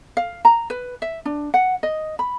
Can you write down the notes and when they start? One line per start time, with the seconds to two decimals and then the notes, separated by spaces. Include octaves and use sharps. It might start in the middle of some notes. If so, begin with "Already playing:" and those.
0.17 F5
0.45 A#5
0.70 B4
1.02 E5
1.25 D4
1.54 F#5
1.83 D#5
2.19 B5